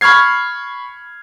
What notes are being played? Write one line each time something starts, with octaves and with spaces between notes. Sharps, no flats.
B5 C#6 F6 G#6 C7